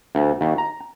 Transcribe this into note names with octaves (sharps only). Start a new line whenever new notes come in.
D2
D#2
A#5